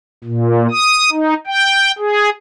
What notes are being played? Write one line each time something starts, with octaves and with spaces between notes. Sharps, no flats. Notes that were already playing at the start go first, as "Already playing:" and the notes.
A#2
D#6
D#4
G5
G#4